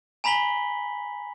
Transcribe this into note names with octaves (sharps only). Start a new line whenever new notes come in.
G#5 A#5 B5 B6 F#7 G7